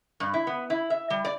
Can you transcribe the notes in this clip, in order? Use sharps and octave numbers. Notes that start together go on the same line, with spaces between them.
G2
E4
B3
E4
E5
G3
D5